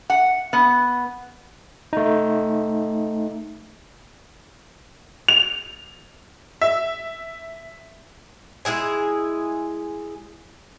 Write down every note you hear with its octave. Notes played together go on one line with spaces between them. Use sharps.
F#5
B3
A3 D#4
F7
E5
G#3 E4 G#4 G#5